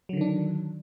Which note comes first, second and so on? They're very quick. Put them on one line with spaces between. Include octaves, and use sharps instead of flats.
F#3 D3 D#3 D4